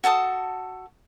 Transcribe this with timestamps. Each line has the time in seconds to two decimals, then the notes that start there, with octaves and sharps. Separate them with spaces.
0.04 F#4 A4 A5 D#6